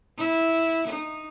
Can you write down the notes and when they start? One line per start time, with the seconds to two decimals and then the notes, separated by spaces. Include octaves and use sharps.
0.17 E4
0.87 D#4